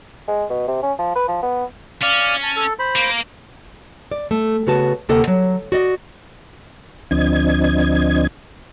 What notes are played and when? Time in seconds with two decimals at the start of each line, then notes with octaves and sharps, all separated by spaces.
0.28 G#3
0.50 B2
0.68 C3
0.83 C#4
0.99 F3
1.16 B4
1.28 F3
1.43 B3
2.02 C#4 D5 F5
2.43 A5
2.56 A4
2.79 C5 B5
2.95 A#3
4.11 D5
4.31 A3
4.67 C#3 B3 F#4 B4 A5
5.09 D2 C3 A#3 A4 D#5 F#5
5.28 F#3
5.72 F#4 D5 D#5
7.11 D2 F3 C4 D4 D#5 G#6